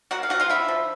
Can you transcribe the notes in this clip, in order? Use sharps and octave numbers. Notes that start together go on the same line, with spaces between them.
A#3 F#4 F#5
F5
F3 F#4 F#5
F4 F5
D3 E4 E5
F3